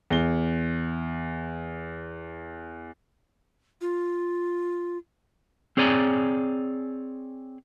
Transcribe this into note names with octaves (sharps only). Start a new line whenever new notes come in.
E2 G7
F4
C4 G#4 C#5 D5 G#5 A#5